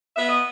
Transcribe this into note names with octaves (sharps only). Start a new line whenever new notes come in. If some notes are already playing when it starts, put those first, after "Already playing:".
B3 E5
D#5